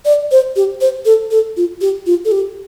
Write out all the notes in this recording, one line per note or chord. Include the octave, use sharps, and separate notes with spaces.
D5
C5
G4
C5
A4
A4
F4
G4
F4
A4
G4